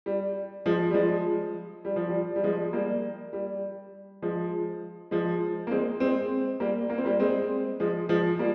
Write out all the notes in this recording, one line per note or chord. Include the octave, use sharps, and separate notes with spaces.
G3
F3 G#3
G3
F3 G#3
G3
F3
G3
G3
F3 G#3
G3 A#3
G3
F3 G#3
F3 G#3
A#3
G#3 C4
G#3 C4
G3 A#3
A#3
C4
G3 A#3
G#3 C4
F3 G#3
F3 G#3
G3 A#3